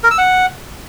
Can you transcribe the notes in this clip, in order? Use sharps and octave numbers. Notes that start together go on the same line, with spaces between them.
A#4
E6
F#5